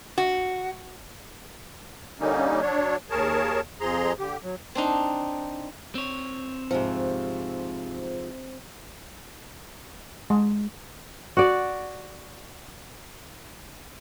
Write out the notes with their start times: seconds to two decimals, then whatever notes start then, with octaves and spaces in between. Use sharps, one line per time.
0.18 F#4
2.20 D3 G3 A#3 C#4 D#4
2.61 F#3 D4 C#5
3.10 D#2 G#4 A#4 C#5 A5
3.81 F2 F3 G#4 A#5 C6
4.19 D3 G4
4.43 F#3
4.75 C4 D4 D#4
5.95 C4 C#5
6.71 G#2 C3 F3
10.30 G#3
11.37 F#4 D5